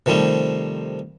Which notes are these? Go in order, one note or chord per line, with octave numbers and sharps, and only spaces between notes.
C3 D#3 F3 G3 A3